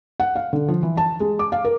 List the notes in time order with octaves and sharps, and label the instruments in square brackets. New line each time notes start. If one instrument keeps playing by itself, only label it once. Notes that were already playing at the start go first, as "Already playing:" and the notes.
[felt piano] F#5
F5
D3
F3
E3
A5
G#3
D6
F5
A#4